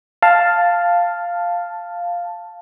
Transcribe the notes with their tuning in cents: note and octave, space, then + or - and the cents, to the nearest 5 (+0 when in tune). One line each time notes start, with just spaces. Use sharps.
F5 +0 A5 +5